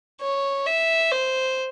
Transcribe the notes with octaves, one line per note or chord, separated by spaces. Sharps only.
C#5
E5
C5